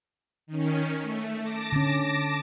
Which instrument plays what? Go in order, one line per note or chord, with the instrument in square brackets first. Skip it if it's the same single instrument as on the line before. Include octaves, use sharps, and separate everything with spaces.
[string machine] D#3 C#4
A3
A5 D6 A#6
[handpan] D3 C#4